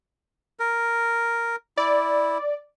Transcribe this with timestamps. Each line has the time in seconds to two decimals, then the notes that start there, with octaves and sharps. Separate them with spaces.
0.59 A#4
1.77 E4 D5